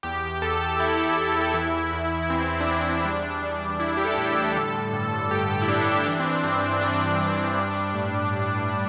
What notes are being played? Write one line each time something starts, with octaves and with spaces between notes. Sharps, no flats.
E2 G4
E2 A4
E2 E4
E2
E3
E2
E2 C4
D4
E2 C4
G3 D4
E3
G3 E4
E4
G4
A4
A2
A4
D3
G2
G2 G4
E4
G2 D4
E3 D4
C4
G2 C4
G3 D4
G2 D4
G3
A2
A2
A2